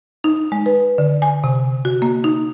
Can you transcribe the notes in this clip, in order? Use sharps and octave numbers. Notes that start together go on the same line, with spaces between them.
D#4
G#3
B4
D3
G#5
C3
F#4
A#3
D#4